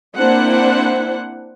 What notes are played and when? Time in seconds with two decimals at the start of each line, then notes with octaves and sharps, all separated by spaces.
0.16 A#3 C4 D4 E4 C5 F#5